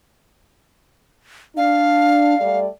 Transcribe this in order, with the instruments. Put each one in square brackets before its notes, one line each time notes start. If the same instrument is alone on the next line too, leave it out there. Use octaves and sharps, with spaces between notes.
[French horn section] D4 [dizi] F5
[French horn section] G3 A3 D5